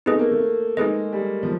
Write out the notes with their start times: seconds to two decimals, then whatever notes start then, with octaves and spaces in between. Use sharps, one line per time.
0.06 A3 D#4 G#4 B4 D#5
0.19 A#3
0.31 A3
0.77 G#3 D#4 G#4 B4 D#5
1.13 G3
1.43 F3